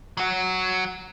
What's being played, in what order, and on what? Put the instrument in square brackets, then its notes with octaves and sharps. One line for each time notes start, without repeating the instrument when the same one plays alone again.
[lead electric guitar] F#3 F#4